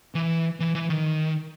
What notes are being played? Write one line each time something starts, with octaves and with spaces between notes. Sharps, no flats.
E3
E3
E3
D#3